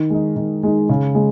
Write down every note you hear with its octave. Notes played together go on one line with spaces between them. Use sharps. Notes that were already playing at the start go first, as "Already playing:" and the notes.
Already playing: D#3
G#3 D#4
D#3
G#3 D#4
C#3
G#3